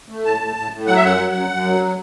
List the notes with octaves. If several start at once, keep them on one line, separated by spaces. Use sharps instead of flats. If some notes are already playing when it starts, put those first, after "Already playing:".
A3
A2 A5
A2
A2
A2
F#3 F#5
E5
F#2 F#5
F#3
F#2
F#2
F#3